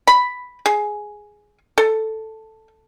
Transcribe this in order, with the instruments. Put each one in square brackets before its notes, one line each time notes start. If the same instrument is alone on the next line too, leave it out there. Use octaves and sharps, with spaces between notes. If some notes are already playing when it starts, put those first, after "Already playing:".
[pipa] B5
G#4
A4